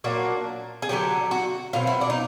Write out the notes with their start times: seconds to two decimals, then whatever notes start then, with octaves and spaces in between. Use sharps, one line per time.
0.04 A#2 F#3 A#3 D4 F#4
0.82 G#4
0.89 D3 F#3 B3 D4 G4
1.31 F#4
1.73 B2 F#3 A3 C4 F4
1.87 E4
2.01 D4
2.10 D#4